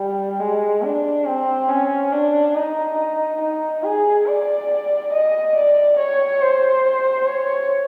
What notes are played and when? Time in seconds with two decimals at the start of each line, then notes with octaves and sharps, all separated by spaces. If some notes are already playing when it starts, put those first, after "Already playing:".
Already playing: G3
0.40 G#3
0.83 D4
1.26 C4
1.69 C#4
2.12 D4
2.54 D#4
3.40 D#4
3.84 G#4
4.27 D5
5.12 D#5
5.56 D5
5.98 C#5
6.41 C5
7.27 C#5